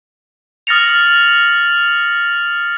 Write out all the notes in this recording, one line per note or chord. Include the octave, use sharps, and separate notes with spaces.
D#6 F6 A6 A#6 C#7 F7